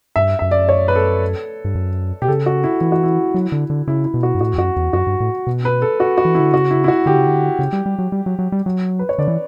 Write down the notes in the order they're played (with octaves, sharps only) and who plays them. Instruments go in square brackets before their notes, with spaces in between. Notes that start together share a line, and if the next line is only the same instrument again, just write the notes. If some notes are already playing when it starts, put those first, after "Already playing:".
[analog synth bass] G2 [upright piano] E5
[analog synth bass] F#2 [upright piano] E5
[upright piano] D5
C#5
B4
A4
[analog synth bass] G2
F#2
[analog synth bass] B2 [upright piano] G4
[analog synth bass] C#3 [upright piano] A4
[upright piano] F#4
E4
[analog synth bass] E3 [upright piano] E4
[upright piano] F#4
E4
[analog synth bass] F#3
D3
D3
[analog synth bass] C#3 [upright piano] E4
[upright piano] E4
[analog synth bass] B2
[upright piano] F#4
[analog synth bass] G2
[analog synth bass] A2 [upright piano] F#4
[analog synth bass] E2
[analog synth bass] F#2 [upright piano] F#4
[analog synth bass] E2
[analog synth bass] F#2 [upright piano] F#4
[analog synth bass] G2
A2
B2
[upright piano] B4
A4
F#4
F#4
[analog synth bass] E3
[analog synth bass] D3 [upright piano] E4
[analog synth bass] C#3 [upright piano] F#4
[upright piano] E4
E4
F#4
[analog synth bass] D3 [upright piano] G4
[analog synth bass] C#3
D3
C#3
G3
G3
F#3
G3
F#3
F#3
G3
F#3
[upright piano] B4
C#5
[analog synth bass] D3 [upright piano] D5
[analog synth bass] E3